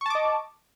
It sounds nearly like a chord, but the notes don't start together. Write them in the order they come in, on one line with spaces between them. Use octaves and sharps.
C#6 A5 D6 D#5